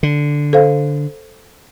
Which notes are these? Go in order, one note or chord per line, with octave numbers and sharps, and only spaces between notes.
D3
A4 C5 F5